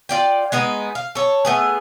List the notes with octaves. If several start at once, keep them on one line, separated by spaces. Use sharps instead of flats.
F4 D5 G5
G#3 B3 D#4 G#4
F5
A4 C#5
A3 B3 G#4